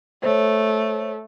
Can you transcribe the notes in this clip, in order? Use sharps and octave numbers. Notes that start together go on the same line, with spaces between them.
A3 C5 C#5